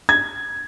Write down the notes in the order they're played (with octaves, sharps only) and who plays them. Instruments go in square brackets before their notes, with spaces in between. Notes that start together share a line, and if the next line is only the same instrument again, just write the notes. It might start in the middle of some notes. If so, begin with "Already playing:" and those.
[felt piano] G#6